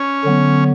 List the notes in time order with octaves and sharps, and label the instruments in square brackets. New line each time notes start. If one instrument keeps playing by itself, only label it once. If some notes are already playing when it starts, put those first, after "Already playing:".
Already playing: [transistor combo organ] C#4
[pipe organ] D3 F#3 B3